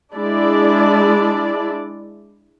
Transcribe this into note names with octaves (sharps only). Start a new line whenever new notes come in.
G#3 D4 E4 D5